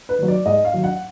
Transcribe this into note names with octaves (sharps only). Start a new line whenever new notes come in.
B4
D#3 F#3
D5
G#2 D#5
F5
D#3 F#3
F#5